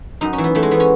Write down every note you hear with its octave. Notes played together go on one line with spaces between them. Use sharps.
F#2 D#4
C#4
E3
B3
E3 A3
G#3
E3 B3
C#4